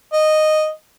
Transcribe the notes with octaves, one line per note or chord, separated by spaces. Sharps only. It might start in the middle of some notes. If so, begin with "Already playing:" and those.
D#5